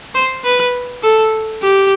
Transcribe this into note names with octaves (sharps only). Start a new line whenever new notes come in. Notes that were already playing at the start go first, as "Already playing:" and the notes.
C5
B4
A4
G4